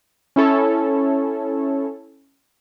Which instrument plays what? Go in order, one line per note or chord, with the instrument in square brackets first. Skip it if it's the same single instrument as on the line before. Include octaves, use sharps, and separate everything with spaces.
[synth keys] C#4 E4 A4 C#5